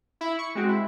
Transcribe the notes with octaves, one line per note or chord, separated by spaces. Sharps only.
E4
C#6
G#3 C4 F#4
E4